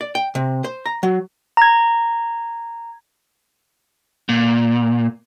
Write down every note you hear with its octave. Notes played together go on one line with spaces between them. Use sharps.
D5
G5
C3
C5
A#5
F#3
A#5 G#6
A#2